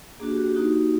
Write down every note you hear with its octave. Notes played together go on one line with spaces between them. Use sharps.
A#3 D4 F#4 G#4
G4
F#4
G4
A#3 D#4 F#4